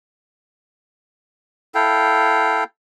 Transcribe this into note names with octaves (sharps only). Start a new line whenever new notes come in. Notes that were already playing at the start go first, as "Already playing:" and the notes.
E4 A4 F5 G5